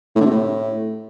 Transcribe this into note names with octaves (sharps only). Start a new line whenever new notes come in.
A2
D3
C3
A2